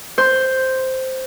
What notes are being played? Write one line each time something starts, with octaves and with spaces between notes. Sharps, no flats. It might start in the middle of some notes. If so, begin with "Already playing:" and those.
C5 C6